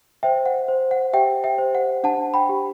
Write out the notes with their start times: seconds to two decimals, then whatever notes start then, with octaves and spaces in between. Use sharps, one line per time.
0.23 C5 E5 G5
0.46 F#5
0.68 C5
0.91 F#5
1.13 G4 E5 G5
1.44 E5 G5
1.58 C5
1.75 F#5
2.04 D4 F#5 A5
2.34 G5 B5
2.49 G4